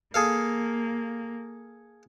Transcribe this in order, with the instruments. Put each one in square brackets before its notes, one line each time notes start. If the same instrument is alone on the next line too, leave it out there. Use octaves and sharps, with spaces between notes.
[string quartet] A#3 [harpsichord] G#4 A4 F5